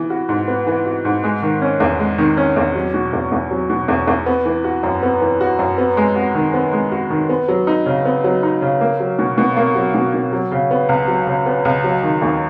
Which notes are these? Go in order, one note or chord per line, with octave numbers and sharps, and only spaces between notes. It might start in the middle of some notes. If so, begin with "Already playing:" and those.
Already playing: E3 B3
F#4
G#2
B3
E3
F#4
G#2
G#3
D#3
C#4
E2
G#3
D#3
C#4
E2
F#3
B2
E2
E2
F#3
B2
E2
E2
B3
E3
F#4
F#2
B3
E3
F#4
F#2
B3
G#3
F#4
D#3
B3
G#3
F#4
D#3
B3
F#3
D#4
C#3
B3
F#3
D#4
C#3
A#3
F#3
B2
B2
A#3
F#3
B2
B2
F#3
C#3
B3
C#2
F#3
C#3
B3
C#2
F#3
D#3
D#2